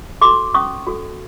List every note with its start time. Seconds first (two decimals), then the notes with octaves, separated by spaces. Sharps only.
0.21 F#4 A4 C6 D6
0.54 C#4 C#6 D#6
0.87 F#4 A4